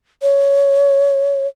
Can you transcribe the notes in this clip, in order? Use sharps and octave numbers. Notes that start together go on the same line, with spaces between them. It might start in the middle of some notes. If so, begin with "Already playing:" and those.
C#5